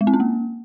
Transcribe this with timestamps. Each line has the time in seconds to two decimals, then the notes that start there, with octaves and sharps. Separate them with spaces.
0.01 G#3
0.07 C4
0.14 C#4
0.20 A#3